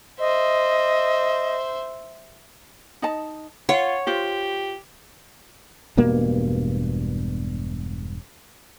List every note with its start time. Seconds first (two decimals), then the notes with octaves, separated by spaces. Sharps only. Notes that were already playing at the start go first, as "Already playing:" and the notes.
0.20 C5 D#5 E5
3.02 D#4 D#5 A5
3.69 F4 C#5 F#5
4.07 F4 G4 C5
5.97 E1 G2 B2 A#3